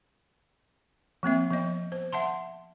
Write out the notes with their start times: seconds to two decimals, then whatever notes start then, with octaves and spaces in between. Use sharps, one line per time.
1.23 F3 A#3 C4 E5
1.50 F3 B3 D#5
1.92 C5
2.13 E5 F#5 A5 C6